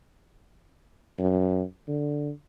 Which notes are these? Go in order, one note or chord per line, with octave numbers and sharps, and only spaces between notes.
F#2
D3